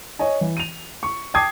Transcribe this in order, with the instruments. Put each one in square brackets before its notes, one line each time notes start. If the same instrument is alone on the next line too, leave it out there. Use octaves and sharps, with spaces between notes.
[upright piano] C#5 D#5 G#5
E3
D#7 F7
C#6
G5 A5 D6 D#6 G#6 C7